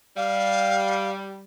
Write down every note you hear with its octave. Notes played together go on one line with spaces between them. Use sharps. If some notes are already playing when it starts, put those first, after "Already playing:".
G3 F5